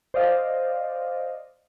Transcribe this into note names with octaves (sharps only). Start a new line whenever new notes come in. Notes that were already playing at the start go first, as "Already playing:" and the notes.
C5 D5 D#5 F5